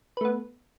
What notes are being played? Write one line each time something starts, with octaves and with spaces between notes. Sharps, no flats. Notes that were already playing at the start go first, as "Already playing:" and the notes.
A3 B3 B4